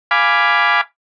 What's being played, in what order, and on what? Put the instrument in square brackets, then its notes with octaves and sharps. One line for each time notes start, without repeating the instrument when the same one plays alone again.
[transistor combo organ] F5 G#5 B5 D6